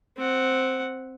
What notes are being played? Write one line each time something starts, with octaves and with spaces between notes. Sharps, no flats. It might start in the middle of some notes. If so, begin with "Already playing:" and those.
C4 F#5